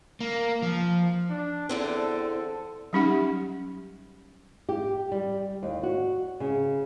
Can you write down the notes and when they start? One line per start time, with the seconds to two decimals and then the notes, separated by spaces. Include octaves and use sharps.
0.20 A#3
0.62 F3
1.30 D4
1.69 E2 D3 C4 A4
2.93 F#3 G3 C#4 D#4 G4 F#5
4.69 G4
5.12 G3
5.63 D#2
5.83 F#4
6.40 C#3